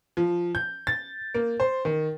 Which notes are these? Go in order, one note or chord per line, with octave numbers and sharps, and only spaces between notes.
F3
G6
A6
A#3
C5
D#3